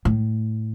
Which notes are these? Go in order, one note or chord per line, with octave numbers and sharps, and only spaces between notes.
A2